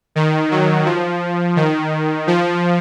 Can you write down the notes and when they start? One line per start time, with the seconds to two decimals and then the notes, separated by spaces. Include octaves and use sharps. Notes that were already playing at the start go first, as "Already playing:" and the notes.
0.15 D#3
0.51 F#3
0.86 F3
1.56 D#3
2.27 F3